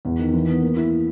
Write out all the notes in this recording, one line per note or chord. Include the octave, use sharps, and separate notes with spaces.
E2
D#3
E3
B3
A#3
E4